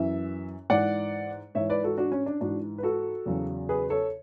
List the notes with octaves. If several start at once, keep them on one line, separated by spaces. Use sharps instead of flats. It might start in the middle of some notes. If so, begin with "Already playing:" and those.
Already playing: F#2 E3 E5
G#2 E3 D5 F#5
G#2 E3 C#5 E5
B4 D5
F#4 A4
D4 F#4
C#4
D4
G#2 E3 D4 F#4
B4
F#4 A4
E2 C#3 F#3
G#4 B4
A4 C#5